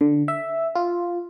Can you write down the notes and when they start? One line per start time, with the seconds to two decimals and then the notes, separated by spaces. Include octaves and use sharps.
0.01 D3
0.28 E5
0.75 F4